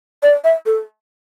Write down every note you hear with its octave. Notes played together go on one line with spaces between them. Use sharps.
D5
E5
A4